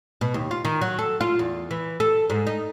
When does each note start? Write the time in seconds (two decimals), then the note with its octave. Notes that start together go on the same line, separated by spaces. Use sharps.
0.21 B2
0.34 D#2
0.51 F4
0.65 D#3
0.81 F#3
0.99 A4
1.21 F4
1.39 E2
1.71 E3
2.00 A4
2.30 G#2
2.47 D#4